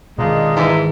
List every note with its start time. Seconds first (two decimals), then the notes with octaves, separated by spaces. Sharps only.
0.18 B2 D#3 G#3 D4 D#4 F4
0.56 G#2 D#3 E3